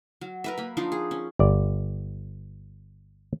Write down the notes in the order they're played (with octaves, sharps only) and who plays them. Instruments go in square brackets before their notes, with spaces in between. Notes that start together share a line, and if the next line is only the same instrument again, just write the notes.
[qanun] F#3
A#4 B4 E5
A#3 B5
F3 D4 D#4 F4
G#4
C#4
[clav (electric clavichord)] G1 D5